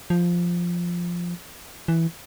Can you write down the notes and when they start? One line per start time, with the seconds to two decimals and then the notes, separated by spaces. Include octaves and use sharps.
0.10 F3
1.88 E3